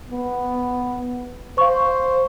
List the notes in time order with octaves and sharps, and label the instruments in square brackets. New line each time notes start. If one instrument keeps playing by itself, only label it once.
[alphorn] B3
[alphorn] C5 [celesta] F5 C#6